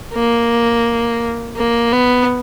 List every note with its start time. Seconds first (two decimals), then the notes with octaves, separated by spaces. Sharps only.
0.14 A#3
1.57 A#3
1.92 B3